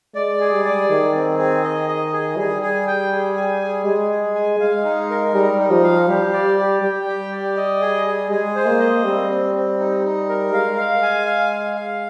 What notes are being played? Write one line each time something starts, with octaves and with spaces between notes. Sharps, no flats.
G#3 D5
G#4
G3
D5
D#3 G#4
C4
G#4
D#5
D#5
G#4
G3 G#4
G#4
G5
G#4
G#5
G#4
G#3 G#4
G#4
G#5
G#3 F5
D#4
A#4
G3 D#4
D#4
F3
F5
G3 G4
D5
G4
G3 G5
G4
D5
D#5
G#4
G#4
G#3 G#4
C5
A#3
D#5
G3 C4
C4
C4
D#4
D#4
A#4
G#3 F5
F5
G#5
F5
F5
F5